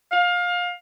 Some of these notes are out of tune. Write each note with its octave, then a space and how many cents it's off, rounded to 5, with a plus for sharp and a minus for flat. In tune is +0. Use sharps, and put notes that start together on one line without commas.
F5 +25